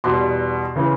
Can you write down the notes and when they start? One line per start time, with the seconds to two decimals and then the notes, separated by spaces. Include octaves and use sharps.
0.04 E2 B2 G3 C6
0.76 C#3 E3